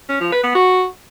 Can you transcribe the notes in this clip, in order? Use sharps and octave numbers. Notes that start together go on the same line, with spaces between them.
C#4
F3
B4
B3
F#4